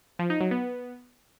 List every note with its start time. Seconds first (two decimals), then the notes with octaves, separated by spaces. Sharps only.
0.19 F3
0.30 D#4
0.41 F#3
0.51 B3